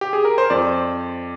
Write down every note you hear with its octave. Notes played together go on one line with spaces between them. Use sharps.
G4
G#4
A#4
C5
F2 D5